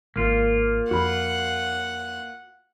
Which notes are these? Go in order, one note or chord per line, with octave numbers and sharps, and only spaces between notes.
G#1 A#3 F4
F2 F#4 F#5 B5